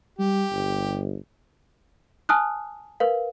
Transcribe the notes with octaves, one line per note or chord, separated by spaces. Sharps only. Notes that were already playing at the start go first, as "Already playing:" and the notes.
G3 G4
G1
G#5 A5 D#6 F6 F#6
A#4 B4 F5